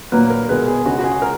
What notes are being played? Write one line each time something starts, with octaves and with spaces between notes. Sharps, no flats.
A#2 F#3 A#3 B4
A#4
B2 G#3 B4
G#4
C#3 G#3 F#4
F#4
G#4
A#4